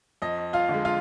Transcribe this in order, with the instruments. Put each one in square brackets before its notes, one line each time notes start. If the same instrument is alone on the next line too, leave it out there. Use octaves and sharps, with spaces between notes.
[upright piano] F2 D#5
F4 F5
D3 G#3
F4 F5